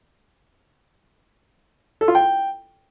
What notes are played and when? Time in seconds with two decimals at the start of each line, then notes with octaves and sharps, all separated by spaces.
2.01 A4
2.08 F4
2.15 G5